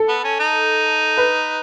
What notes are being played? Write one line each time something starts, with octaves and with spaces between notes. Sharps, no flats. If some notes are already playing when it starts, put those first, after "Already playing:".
Already playing: A4
B3
C#4
D#4
B4